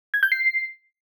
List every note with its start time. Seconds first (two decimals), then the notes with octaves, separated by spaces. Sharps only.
0.14 G#6
0.23 G6
0.32 C7